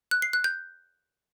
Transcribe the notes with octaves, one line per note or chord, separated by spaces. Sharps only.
F#6
C7
F#6
G6